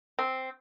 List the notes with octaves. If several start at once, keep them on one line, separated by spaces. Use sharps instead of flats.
C4